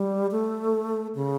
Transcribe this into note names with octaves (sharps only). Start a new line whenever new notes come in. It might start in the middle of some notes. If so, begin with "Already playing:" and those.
Already playing: G3
A3
C#3